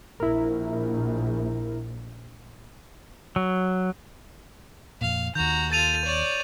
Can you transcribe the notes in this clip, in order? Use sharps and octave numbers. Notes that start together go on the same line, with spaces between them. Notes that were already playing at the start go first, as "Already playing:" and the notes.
A#1 E4 A#4
F#3
F2 A#2 F5
D#2 D#3 F#4 A#5 G6
F4 A4 A6 D#7 F7
C#5 D5